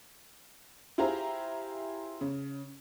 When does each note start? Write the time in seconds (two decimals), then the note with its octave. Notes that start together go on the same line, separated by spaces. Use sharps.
0.98 E4 F4 G4 G#4 C5 A#5
2.21 C#3